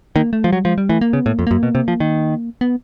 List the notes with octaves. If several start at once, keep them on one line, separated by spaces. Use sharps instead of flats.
D#3 A#3
A3
F3
F#3 G3
F3 G#3
G3
E3 A3
A#3
C#3 B3
A2
A#3
F2
F#2 A#3
B2
C3
F3
D#3
B3